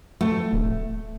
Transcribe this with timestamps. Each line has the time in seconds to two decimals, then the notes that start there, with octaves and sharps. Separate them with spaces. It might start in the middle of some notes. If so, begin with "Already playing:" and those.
0.21 A3
0.53 D1